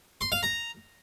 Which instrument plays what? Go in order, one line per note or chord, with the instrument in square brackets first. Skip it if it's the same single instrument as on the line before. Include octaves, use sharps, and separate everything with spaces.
[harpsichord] C6
F5
A#5